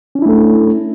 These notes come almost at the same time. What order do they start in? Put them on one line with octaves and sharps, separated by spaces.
C#4 D4 E4 A3 A4